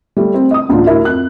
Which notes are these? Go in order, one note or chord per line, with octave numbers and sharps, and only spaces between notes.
G3 A3
C4
D#5 D#6
A1 D2 D3 D4 F4
E4 F#4 A#4 D#5 E5
F2 F#6